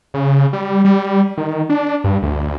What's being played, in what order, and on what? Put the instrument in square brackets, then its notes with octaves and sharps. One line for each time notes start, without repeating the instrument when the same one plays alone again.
[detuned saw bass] C#3
G3
G3
D#3
D4
G2
D2